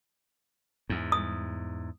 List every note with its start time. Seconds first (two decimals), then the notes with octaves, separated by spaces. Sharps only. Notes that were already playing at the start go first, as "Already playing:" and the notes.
0.90 E2 G#2
1.12 D#6